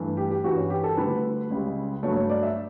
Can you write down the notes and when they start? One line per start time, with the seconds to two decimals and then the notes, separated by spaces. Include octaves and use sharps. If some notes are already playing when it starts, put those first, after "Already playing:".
Already playing: G2 E3 A3
0.17 G4
0.31 G4
0.44 G2 E3 G3 F#4
0.57 C#4
0.70 G4
0.84 A4
0.97 D2 D3 G3 B4
1.50 C#2 C#3 G3
2.03 G2 F#3 A3 C#5
2.16 C#5
2.29 D5
2.43 E5